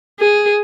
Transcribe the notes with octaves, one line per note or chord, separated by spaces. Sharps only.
G#4